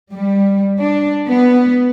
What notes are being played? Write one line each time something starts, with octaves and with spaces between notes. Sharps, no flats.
G3
D4
B3